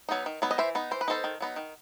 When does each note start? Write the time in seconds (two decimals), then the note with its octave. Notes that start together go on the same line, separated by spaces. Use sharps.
0.09 F#3 B3 D#4
0.26 D#3
0.42 F#3 B3 D#4
0.51 D#5
0.58 E3 C5 E5
0.75 B3 D#4
0.91 E3 C5
1.01 B4
1.08 B3 D#4 A4 C5
1.24 D#3
1.41 F#3 B3 D#4
1.56 D#3